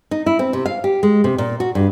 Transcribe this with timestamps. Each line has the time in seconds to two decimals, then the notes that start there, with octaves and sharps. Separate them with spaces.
0.11 D#4
0.26 E4
0.39 C4
0.53 C3
0.66 F5
0.84 G4
1.03 G#3
1.24 C3
1.38 A#2
1.60 F#4
1.75 G2